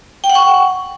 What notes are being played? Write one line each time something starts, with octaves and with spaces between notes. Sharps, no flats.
G5
F#5
C#6